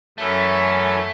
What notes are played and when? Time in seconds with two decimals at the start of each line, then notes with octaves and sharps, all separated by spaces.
0.18 F#2 E3 A3 C#4 A4